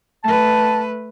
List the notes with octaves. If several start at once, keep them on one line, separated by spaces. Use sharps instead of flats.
A3 B4 A5